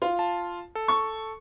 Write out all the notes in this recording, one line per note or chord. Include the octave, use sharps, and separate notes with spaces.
F4
A5
A4
C#6